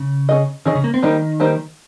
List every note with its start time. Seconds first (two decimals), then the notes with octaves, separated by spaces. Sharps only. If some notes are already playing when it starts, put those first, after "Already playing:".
Already playing: C#3
0.29 C#4 G#4 D#5
0.66 D#3 C#4 G#4 D#5
0.75 C#3
0.84 A#3
0.94 C4
1.03 D#3 G3 A#3 D#4 G4 C5
1.40 G3 A#3 D#4 G4 C5